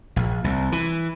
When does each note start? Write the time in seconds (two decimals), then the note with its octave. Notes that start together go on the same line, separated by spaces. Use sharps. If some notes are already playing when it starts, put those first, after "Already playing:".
0.16 A#1
0.44 C2
0.72 E3